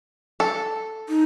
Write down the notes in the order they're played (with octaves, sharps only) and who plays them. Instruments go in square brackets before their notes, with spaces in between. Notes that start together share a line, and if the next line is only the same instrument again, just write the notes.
[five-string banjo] A4
[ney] D#4